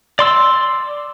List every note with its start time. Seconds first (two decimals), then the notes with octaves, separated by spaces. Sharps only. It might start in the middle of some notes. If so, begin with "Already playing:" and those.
0.19 D5 C6 E6